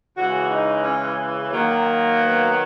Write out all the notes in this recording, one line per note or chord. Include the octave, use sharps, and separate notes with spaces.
C#3 E3 G#3 F#4
D#4
C#4
D#3 F#3 A#3
B3